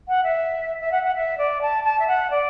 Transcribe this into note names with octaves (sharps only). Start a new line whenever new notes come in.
F#5
E5
E5
F#5
F#5
E5
D5
A5
A5
E5
F#5
D5